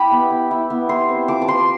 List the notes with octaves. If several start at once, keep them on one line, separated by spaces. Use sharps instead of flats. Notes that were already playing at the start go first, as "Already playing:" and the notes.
Already playing: E4 G4 G5 B5
B3
E4
E4
B3
E4 C6
C4
F3 D6
D6
F3 C6